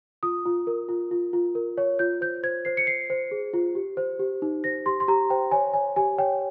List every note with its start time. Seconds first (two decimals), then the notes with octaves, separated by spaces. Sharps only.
0.23 F4 D#6
0.46 F4
0.67 A#4
0.89 F4
1.11 F4
1.33 F4
1.55 A#4
1.78 C#5
1.99 F4 G6
2.21 C5 G6
2.43 C5 G#6
2.65 C5 C7
2.77 C#7
2.87 C5 C7
3.10 C5
3.31 G#4
3.53 F4
3.75 G4
3.97 C5
4.19 G4
4.42 D#4
4.64 C5 A#6
4.86 G4 C6
5.00 C6
5.08 G4 A#5
5.30 C5 G5
5.51 C#5 G#5
5.73 C#5 G#5
5.96 G4 G#5
6.18 C#5 G5